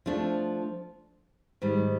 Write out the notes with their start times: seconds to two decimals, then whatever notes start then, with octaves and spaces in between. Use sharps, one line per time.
0.06 F3 A3 D4
1.62 G#2 D#3 G3